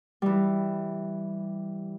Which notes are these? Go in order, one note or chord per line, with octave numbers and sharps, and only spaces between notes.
E3 G3